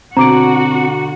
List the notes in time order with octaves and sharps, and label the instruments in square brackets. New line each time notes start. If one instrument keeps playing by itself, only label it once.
[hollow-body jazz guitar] B2 D3 [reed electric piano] C4 [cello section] F#4 [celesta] A#5 D6 D7